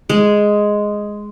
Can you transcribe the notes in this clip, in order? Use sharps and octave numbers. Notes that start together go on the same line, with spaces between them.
G#3